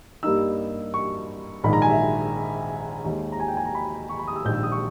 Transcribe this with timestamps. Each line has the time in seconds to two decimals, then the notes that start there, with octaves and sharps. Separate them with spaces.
0.23 G2 G3 A#3 D#4 E6
0.94 C#6
1.63 A#1 G#2 D#3 B5
1.73 A#5
1.82 G#5
1.90 E5
3.04 D#2 D#3 G#3
3.32 A#5
3.40 G#5
3.48 G5
3.57 G#5
3.66 A#5
3.75 B5
4.09 C#6
4.19 B5
4.27 D#6
4.36 E6
4.45 A#1 G#2 D#3 G6
4.53 E6
4.63 D#6
4.72 C#6